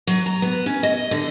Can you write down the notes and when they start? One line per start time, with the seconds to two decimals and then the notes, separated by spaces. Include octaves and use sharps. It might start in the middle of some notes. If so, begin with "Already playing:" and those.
0.07 F#3
0.26 A#5
0.42 B3
0.66 C#4
0.83 D#5
1.11 D3